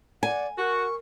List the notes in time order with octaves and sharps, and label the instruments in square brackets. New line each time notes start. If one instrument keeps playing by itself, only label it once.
[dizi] D5 [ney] F#5 [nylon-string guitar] G#5
[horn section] F#4 [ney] A#4 [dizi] C#6